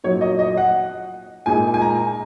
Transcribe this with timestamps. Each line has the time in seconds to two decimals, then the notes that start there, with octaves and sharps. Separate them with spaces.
0.04 A#2 F#3 D#4 C#5
0.21 D#5
0.39 D#5
0.57 F#5
1.46 A#2 G#3 D#4 G#5
1.74 G#5
1.82 A#5